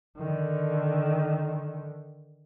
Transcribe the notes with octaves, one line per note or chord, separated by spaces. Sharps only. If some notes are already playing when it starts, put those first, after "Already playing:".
D3 D#3